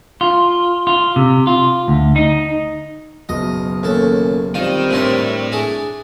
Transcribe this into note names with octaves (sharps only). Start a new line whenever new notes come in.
F4
F4
C3
F4
D2
D#4
F#1 B2 D#5
D#2 C#4 A4
D#3 G3 C4 D#4 F4
A2 C3 D4 E4 A#4 C#5 C6
D4 G#4